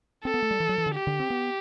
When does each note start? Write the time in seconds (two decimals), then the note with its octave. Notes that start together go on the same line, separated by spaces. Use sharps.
0.24 C4 A4
0.34 B3
0.43 A3
0.51 G3
0.60 E3
0.69 F#3
0.78 E3
0.86 D3
0.95 G4
1.07 D3
1.20 C4
1.30 B3